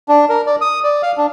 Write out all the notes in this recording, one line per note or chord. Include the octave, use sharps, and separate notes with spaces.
D4
A#4
D5
D#6
D5
F5
D4